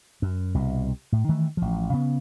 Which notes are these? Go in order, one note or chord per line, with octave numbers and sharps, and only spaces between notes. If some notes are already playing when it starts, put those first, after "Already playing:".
F#2
C2 B2
A2
D#3 E3 A3
A1 F3
C#3 B3